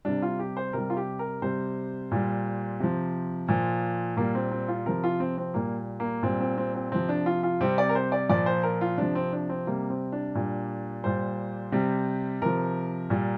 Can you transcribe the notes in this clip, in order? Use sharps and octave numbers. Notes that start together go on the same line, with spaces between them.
C3 G3 D4
F4
G4
C5
C3 G3 A#4
F4
G4
A#4
C3 G3 C5
A#2 G3
C3 F3
A#2 F3
A#2 G3 A#3
C4
C4
F4
C3 F3 A#4
F4
C4
C4
A#2 G3 A#3
A#3
A#2 G3 C4
C4
C4
C4
C3 F3 C4
D4
F4
F4
C3 G3 C4
D5
A#4
C5
D5
A#2 F3 D5
C5
A#4
F4
C3 F3 D4
C4
D4
C4
C3 G3 A#3
C4
D4
A#2 G3
A#2 G3 C5
C3 G3
C3 F3 A#4
A#2 G3